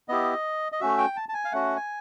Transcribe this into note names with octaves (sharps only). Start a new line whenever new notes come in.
B3 E4 G4 D#5
D#5
A3 C#4 F#4 E5
G5
A5
A5
G#5
F5
A3 C#4 F#4 F#5
G#5